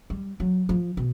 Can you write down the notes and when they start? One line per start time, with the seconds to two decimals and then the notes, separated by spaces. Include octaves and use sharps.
0.10 G3
0.40 F#3
0.69 F3
0.97 B2